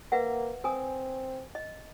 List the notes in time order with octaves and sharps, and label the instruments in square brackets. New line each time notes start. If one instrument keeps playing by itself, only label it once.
[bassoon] A#3 [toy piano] B4 E5 F#5
[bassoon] C4 [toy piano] A#4 G#5 D#6
[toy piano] D#5